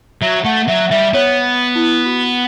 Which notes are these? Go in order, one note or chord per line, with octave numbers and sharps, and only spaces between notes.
F#3 E5
A3 F#5
F#3 E5
G3 E5
B3 C#5
E4
F#4